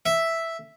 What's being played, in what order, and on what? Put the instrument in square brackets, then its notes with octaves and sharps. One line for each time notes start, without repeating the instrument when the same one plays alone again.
[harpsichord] E5